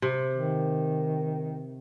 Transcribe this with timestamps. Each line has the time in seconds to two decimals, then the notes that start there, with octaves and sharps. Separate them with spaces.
0.02 C3
0.33 D#3